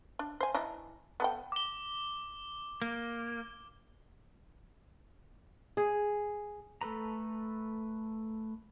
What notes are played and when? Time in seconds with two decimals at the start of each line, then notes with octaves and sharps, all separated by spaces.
0.19 D4
0.40 C5 G#5
0.54 E3 D4 D#4
1.20 B3 A4 G5
1.52 D6 G7
2.82 A#3
5.77 G#4
6.81 A3 A4 B4 A#5